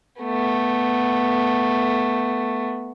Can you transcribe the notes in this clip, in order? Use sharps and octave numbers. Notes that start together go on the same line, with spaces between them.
A3 B3